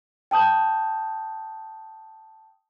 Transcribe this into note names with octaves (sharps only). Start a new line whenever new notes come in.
G5 A5 D#6 G6